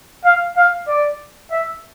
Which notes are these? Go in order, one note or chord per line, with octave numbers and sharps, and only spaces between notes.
F5
F5
D5
E5